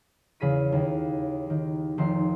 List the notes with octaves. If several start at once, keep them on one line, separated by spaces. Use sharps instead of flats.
E2 C#3 G#4 B6 D#7
D#2
D#3
F1 D#3 C6